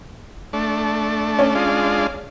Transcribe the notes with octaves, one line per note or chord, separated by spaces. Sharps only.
A3 D4
C#4
G#3 D4 F4